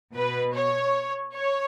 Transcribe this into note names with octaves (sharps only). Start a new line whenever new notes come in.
B2 B4
C#5
C#5